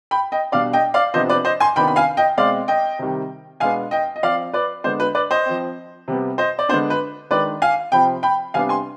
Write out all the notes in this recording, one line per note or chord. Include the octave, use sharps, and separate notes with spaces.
G5 B5
D#5 G5
B2 G3 D4 D5 F5
D#5 G5
D5 F5
C3 F3 B3 D4 C5 D#5
B4 D5
C5 D#5
G#5 C6
C3 D#3 B3 D4 G5 B5
B5
F5 G#5
D#5 G5
B2 G#3 C4 D5 F5
D#5 G5
C3 D#3 G3
B2 G#3 B3 D4 F5 G#5
D#5 G5
D#5
F3 C4 D5 F5
B4 D5
D3 G#3 B3 D4 C5
B4
B4 D5
C5 D#5
F3 C4
C3 G3 B3
C5 D#5
D5
D3 G#3 B3 D4 C5
B4
D#3 G#3 D4 B4 D5
F5 G#5
C3 F3 C4 G5 B5
G5 B5
C3 G3 B3 D4 F5 G#5
G#5 C6